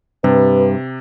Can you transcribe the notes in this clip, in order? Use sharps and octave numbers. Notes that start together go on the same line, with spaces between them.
G2 C3 B4